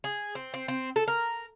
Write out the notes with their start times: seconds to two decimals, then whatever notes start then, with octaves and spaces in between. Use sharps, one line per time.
0.04 G#4
0.35 C4
0.54 C4
0.68 C4
0.96 A4
1.08 A#4